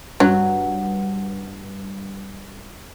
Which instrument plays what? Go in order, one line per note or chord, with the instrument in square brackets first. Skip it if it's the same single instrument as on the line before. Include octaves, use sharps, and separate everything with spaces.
[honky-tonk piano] G2 [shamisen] F#3